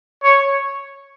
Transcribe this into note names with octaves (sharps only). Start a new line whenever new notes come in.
C#5